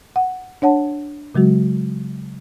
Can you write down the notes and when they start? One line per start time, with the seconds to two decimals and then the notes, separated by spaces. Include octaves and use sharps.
0.16 F#5
0.62 D4 C#5 F#5 A5
1.35 C#3 F#3 G#3 F#4